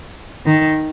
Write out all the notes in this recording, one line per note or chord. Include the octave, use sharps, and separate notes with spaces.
D#3